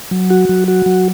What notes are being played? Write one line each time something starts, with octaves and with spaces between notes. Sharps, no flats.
F#3
F#4
F#3
F#4
F#3